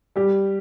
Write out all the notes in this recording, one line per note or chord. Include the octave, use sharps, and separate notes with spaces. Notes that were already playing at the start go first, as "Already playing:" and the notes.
G3 G4